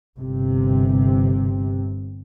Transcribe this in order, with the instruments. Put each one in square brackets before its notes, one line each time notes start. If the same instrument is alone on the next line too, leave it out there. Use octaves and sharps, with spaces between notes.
[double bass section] G1 C3